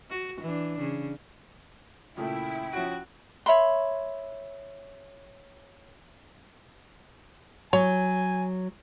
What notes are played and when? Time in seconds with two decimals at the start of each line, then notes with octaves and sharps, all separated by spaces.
0.10 F#4
0.41 E3 D4
0.79 C#3
2.17 A#2 C#3 A3 E4 G5
2.73 F3 C#4 F#4 D7
3.46 C#5 E5 B5 C6
7.73 F#3 C#5 G#5